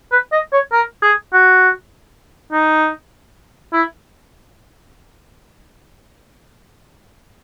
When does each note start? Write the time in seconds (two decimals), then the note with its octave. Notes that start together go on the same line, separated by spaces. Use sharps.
0.12 B4
0.32 D#5
0.53 C#5
0.72 A#4
1.02 G#4
1.33 F#4
2.53 D#4
3.73 E4